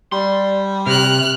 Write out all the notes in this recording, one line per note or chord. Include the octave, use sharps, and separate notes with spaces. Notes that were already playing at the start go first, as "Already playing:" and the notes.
G3 D5 C6
C3 G4 F6 F#6